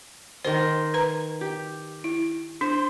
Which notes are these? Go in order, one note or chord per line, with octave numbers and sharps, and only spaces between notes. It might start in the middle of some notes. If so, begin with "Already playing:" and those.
D#3 A#4 C5 C6
B4 A#5
G4
E4
D4 C5